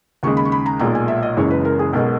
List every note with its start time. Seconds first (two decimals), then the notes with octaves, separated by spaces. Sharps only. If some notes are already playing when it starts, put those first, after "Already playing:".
0.23 D#2 C#3 G#3 C#6
0.37 B5
0.45 C#6
0.52 B5
0.66 A#5
0.79 B1 A#2 G#3 A#5
0.95 G#5
1.08 E5
1.23 D#5
1.36 F#1 F#2 E3 G#3 C#5
1.51 B4
1.65 A#4
1.79 G#4
1.93 B1 B2 G#3 A#4